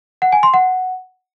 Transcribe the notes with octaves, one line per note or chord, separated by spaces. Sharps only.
F#5
G#5
C6
F#5